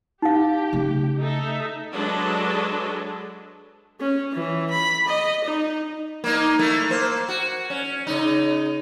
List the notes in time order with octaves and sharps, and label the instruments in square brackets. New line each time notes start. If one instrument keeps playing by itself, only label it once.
[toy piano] D#4 F5 [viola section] G4
[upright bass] C#3 A3
[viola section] D#4 A4 E5
F#3 G#3 D4 A4 B4
[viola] C#4
E3
B5
D#5
D#4
[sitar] A#3 D#4
A3 A#3 E4
A#3 C5
F#4
C#4
C#3 D#4